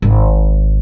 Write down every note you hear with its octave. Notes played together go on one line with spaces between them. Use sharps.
G#1